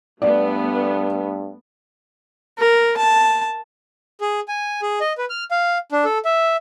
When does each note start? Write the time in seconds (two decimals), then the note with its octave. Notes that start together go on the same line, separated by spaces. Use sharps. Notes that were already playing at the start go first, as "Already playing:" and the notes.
0.22 G2 A3 B3 D5
2.58 A#4
2.97 A5
4.21 G#4
4.48 G#5
4.82 G#4
5.01 D#5
5.18 B4
5.30 F6
5.51 F5
5.92 D4
6.05 A4
6.25 E5